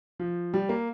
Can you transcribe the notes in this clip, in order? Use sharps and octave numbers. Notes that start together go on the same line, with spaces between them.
F3
G3
A#3